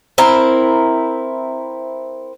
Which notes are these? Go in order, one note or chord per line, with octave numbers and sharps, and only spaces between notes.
C4 E4 A#4